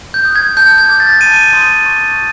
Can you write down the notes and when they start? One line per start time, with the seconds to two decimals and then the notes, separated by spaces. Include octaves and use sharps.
0.14 G6
0.25 D#6 F#6
0.36 G#6
0.57 A5 G6
0.78 G#6
0.89 D6 F6
1.00 A6
1.21 A5 D#7
1.53 C6 D#6 G6
1.86 C#6